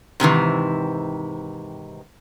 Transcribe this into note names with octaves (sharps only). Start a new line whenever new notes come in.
G#2 C3 D#3 E3